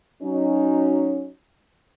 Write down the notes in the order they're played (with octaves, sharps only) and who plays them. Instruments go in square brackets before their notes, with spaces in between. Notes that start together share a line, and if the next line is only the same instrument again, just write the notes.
[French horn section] F#3 C#4 D#4